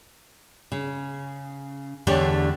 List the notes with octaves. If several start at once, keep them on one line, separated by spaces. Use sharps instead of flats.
C#3
E2 D3 A3 D4 G4 C#5